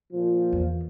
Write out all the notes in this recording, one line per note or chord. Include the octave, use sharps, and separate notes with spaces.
A#2 F3
E2